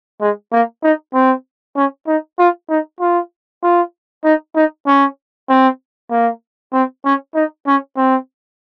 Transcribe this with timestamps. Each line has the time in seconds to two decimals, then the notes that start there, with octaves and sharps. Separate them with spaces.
0.21 G#3
0.52 A#3
0.83 D#4
1.14 C4
1.76 C#4
2.07 D#4
2.39 F4
2.70 D#4
3.00 F4
3.63 F4
4.24 D#4
4.56 D#4
4.86 C#4
5.49 C4
6.11 A#3
6.73 C4
7.05 C#4
7.35 D#4
7.67 C#4
7.97 C4